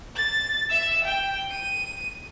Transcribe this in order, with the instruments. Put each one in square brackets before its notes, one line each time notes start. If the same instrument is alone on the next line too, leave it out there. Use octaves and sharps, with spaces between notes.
[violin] A6
E5 E6
G5
D#7